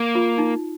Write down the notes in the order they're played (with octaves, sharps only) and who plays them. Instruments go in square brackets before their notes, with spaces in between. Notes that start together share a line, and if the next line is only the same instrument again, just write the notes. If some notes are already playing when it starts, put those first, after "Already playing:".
Already playing: [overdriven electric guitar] A#3
[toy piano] F4
D#4